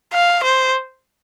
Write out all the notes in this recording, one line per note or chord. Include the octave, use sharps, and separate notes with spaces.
F5
C5